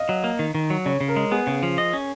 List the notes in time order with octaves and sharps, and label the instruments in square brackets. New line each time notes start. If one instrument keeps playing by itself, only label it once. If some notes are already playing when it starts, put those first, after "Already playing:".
Already playing: [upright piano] D#5 F5
[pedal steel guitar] F#3
A#3
D#3
D#3
F#3
[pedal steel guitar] C#3 [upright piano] C#5
[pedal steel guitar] C#3
[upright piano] A#4
[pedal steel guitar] G#3
[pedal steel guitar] B3 [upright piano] G#4
[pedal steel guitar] C#3
F3
D#5
C#4